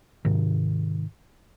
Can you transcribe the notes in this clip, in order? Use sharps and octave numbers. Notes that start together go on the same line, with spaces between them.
G#2 C3 D#3